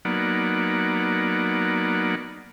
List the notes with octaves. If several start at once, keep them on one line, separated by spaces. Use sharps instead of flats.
F#3 A#3 B3 D#4 D5 F#5